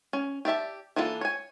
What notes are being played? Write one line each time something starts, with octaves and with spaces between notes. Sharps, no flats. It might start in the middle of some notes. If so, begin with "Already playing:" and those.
C#4
G4 D5 E5 A5
E3 A#3 D4 F4 A4
C#5 G#5